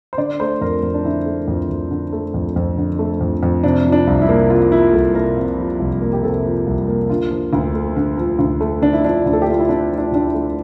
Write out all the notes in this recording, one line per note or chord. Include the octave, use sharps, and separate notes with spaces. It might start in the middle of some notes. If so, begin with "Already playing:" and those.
C5
D3 D5
A3 C5
F2 A#4
F2
D4
D3 E4
A3
F2
F2
D3
A3
F2
F2
D3
A3
F2
F2
C3 D4
F3
D4
C2
E4
A#3
C3 F4
F3 E4
C2 A4
A#3 A#4
C3
F3
C2
A#3
G4
C3 A4
F3
C2
A#3
D3 F4
F3
D2
A3
D3
F3
D2
A3
D3 D4
E4
F3 D4
D2
A4
G4
A3 F4
E4
D3 D4
F3
D4
D2 D4
E4
A3